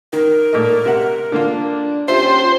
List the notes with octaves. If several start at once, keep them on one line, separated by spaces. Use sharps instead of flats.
D#3 A#4
A#2 A3 D#5
C3 E5 F#5
D3 A#3 D4 F4
D#2 C#4 F4 G4 C5 E5